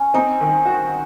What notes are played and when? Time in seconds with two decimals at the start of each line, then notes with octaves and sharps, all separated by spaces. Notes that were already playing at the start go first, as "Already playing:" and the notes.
Already playing: C#4
0.14 C4 D#4
0.41 D#3
0.65 F#4